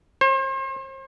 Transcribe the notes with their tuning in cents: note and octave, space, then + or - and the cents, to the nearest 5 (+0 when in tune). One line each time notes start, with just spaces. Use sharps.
C5 +40